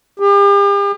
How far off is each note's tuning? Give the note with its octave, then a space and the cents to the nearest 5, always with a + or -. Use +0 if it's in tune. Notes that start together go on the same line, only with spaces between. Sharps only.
G4 +40